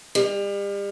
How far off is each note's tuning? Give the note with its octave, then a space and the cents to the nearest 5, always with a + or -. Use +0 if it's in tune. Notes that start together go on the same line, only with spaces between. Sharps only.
G3 +40